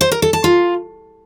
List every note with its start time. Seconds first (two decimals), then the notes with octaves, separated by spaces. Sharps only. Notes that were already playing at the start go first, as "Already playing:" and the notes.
0.01 C5
0.12 A#4
0.22 A4
0.33 A5
0.44 F4